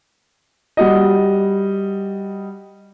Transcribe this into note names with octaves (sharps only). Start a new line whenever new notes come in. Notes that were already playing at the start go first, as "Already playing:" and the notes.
G3 F#4 D#5